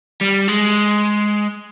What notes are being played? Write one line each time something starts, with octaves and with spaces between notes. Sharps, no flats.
G3
G#3